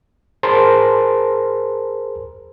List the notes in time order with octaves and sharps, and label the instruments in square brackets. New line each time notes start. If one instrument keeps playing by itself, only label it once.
[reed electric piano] G#4 A#4 C5 A5 C6